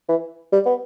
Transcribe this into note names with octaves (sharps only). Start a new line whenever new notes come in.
E3
G3
B3